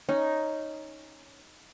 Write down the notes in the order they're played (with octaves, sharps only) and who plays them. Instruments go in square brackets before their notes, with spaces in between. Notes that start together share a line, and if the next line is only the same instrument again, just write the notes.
[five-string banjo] C#4 [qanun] D#4